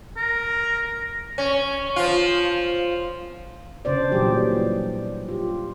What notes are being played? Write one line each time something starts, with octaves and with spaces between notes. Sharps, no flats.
A#4
C#4
F3 F4
C#3 D4 C5 D5
A#2 E3 F#3 G3 G4 G#4
F4 G4